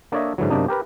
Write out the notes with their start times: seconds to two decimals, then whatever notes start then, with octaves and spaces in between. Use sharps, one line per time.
0.12 A#3 D4 A4 C#5 D#5 E5
0.38 G#2 D3 E3 F#3
0.50 F#2 C3 A#3 D4 D#4
0.68 G4 A#4 B4